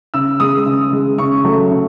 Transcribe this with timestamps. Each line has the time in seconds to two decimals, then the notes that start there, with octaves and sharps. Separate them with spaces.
0.14 C#3 E6
0.40 G#3 D#6
0.66 C#3
0.93 G#3
1.18 C#3 C#6
1.45 F#3 A3
1.71 C#3